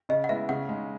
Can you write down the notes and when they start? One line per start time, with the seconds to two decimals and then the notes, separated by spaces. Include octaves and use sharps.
0.09 C#3 D#5
0.24 F#5
0.29 G#3 B3 E4 E5
0.49 C#3 F#5
0.69 G#3 D#4